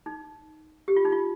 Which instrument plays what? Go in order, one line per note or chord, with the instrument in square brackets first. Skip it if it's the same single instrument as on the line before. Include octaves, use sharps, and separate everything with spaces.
[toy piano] D#4
G4
F4
D#4
F4